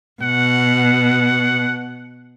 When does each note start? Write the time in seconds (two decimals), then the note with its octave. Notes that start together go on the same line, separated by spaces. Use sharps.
0.22 B2 F#5